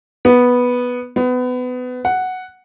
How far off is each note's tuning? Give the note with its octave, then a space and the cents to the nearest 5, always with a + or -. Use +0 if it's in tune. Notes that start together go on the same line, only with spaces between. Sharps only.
B3 -5
B3 +25
F#5 +0